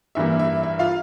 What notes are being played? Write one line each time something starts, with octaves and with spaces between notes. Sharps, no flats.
G2 E3 G3 A#3 E5
E5
E5
F4 F5